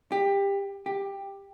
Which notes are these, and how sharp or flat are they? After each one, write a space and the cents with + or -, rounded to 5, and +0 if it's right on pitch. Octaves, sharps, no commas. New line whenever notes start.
G4 +20
G4 +10